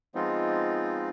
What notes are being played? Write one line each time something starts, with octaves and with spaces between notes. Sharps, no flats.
F3 G#3 B3 C4 D#4 F4